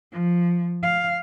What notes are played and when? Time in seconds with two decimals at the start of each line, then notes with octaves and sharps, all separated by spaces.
0.12 F3
0.83 F5